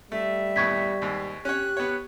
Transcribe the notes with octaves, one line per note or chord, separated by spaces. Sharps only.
G3 A3 E5
D#2 A2 B3 C#6 G#6 B6
D#2 G#2
C#4 G4 C#5 F#6
B3 C#5